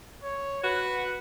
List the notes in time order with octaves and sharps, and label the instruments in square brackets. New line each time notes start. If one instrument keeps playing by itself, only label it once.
[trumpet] C#5
[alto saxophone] F#4 [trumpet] B4